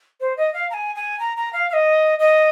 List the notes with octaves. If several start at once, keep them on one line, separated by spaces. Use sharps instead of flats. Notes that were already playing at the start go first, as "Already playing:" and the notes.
C5
D#5
F5
A#5
G#5
G#5
A#5
A#5
F5
F5
D#5
D#5